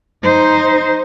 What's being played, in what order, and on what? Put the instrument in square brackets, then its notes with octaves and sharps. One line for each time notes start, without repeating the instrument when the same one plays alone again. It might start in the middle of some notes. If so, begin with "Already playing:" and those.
[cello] D#4 C5